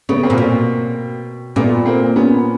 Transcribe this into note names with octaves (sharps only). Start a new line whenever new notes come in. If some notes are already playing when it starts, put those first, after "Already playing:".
C#3 A3 B3
A#3 C4
A#2
B2
A#2 A3 B3
A#3 C4
B3 C#4